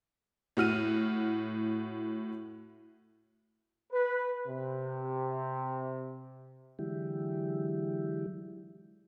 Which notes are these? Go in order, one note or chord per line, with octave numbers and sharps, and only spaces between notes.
A2 F#4 F6 D#7
B4
C3
D3 E3 F#3 G#3 E4 G4